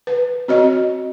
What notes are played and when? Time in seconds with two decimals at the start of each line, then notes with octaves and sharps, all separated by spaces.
0.07 B4
0.48 C4 F#4 C#5 D#5